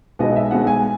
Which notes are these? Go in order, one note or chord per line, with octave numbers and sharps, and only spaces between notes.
B1 B2 G#3 B3 D#5
E5
B1 B2 G#3 B3 F#5
G#5